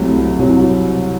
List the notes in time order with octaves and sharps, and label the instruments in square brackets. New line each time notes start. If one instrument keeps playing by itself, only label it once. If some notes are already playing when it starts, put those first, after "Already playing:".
Already playing: [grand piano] C2 C3 F#3 [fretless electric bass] A3
[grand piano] C2 C3 F#3